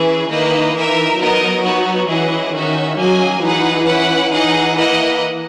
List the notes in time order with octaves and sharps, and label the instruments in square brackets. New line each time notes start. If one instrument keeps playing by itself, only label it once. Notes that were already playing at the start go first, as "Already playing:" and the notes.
Already playing: [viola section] E3 [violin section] C#4 E4 G#4 B4
[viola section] D#3 [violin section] A#3 E4 B4 D#5
[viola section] E3 [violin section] D#4 A#4 E5
[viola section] F#3 [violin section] B3 D#4 A#4 D#5
[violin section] B3 D#4 F#4
[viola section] E3 [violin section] C#4 E4 G#4 D#5 F#5
[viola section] D#3 [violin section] C#4 F#4 C#5 E5
[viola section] F#3 [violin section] A#3 C#4 G#4 D#5 G#5
[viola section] E3 [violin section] D#4 G#4 B4 F#5
[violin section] C#4 E4 B4 F#5
[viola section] E3 [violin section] D#4 G#4 D#5 F#5
[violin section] A#3 E4 B4 D#5 F#5